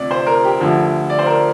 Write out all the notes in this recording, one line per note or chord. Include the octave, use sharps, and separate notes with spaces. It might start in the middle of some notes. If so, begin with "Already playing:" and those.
Already playing: D2 C3 F3 D5
C5
A#4
G4
D2 D3 F3
D5
C5
A#4